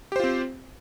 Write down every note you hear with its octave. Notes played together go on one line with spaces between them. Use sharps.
C4 F4 G4 C5